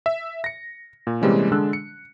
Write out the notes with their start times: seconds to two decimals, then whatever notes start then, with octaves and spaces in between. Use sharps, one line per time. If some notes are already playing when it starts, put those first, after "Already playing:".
0.06 E5
0.44 A#6 C#7
1.07 A#2
1.22 C3 E3 G3 G#3 A#3 C#4
1.51 D3 G#3 D4 E6 F#6
1.73 C#7